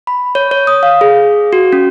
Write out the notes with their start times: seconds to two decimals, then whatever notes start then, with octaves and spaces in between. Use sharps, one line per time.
0.07 B5
0.35 C#5
0.51 C#5
0.67 D#6
0.83 F5
1.01 G#4
1.53 F#4
1.73 C#4